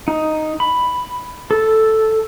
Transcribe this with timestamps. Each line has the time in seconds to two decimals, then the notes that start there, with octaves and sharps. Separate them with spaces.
0.08 D#4
0.60 B5
1.51 A4